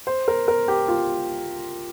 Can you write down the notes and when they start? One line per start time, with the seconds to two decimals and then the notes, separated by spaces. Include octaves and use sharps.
0.07 C5
0.28 A#4
0.48 A#4
0.68 G4
0.88 F4